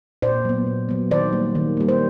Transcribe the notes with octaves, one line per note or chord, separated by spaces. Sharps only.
A#2 C5 D5
F#3 B3
A#2
F#3 B3
D#3 C5 D5
G3 A#3
D#3
G3 A#3
C5